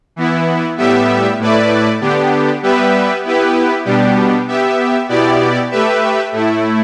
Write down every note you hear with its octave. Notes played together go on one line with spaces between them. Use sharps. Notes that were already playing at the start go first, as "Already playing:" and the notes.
E3 B3 E4
A2 G3 B3 G4 E5
A2 A3 E4 B4 D5
D3 B3 D4 G4
G3 B3 G4 B4 E5
B3 E4 G4 B4
B2 G3 B3 D4 G4
B3 G4 E5
B2 B3 E4 G4 D5
A3 G4 B4 E5
A2 A3 E4